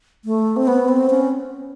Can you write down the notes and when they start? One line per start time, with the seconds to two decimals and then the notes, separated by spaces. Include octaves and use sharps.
0.25 A3
0.56 C4
0.67 B3
0.88 C4
1.10 C#4